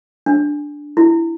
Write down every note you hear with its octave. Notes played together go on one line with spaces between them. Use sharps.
D4
E4